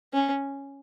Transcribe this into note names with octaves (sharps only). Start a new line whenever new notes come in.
C#4